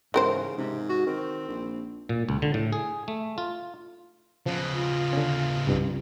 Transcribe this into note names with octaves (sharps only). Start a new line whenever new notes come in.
G#2 C#3 E3 A#4 C5
G#2 C3
F#4
D#3 C4
A#1
A#2
C#2
D3
A2
G#4
A3
F4
C#3 F3 B3
F4
D3 C#4
C2 G2